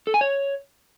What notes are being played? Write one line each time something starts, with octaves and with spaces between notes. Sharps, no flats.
A4
G#5
C#5